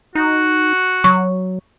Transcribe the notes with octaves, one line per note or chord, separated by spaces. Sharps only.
D#4 F#4
F#3 C#6